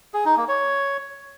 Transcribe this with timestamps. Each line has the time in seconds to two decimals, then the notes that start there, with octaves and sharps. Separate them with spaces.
0.14 G#4
0.25 D#4
0.37 A#3
0.48 C#5